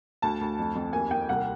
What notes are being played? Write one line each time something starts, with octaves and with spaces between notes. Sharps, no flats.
D2 A5
D2
F2
F2
D#2 G#5
D#2 G5
C2 F#5